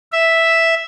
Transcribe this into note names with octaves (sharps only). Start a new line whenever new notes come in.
E5